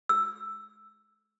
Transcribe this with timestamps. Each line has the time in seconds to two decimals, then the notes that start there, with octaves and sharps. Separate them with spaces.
0.09 E6